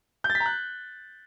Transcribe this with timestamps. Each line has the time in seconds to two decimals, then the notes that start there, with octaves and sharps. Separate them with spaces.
0.24 G6
0.30 A6
0.35 B6
0.40 A#5
0.46 F#6